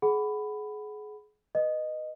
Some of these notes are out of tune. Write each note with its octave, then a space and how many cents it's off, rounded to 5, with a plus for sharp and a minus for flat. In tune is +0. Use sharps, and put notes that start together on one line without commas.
G#4 +30 F#5 +10 B5 +10
B4 +0 D#5 -10